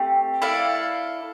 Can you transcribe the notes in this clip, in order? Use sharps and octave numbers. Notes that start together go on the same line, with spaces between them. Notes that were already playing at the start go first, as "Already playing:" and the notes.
Already playing: A3 C4 G4
E4 A4 D5 F5